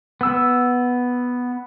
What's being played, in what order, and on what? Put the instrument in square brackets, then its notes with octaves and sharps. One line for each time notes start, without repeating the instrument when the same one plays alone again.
[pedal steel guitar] B3 E6